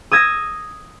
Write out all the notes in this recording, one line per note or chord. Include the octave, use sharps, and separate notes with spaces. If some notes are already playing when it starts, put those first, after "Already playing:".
D#6 E6 G#6 A#6